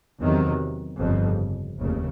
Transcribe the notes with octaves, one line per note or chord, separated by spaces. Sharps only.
E2 C3 D#3 F#3
G1 F2 C#3
F1 D#2 C#3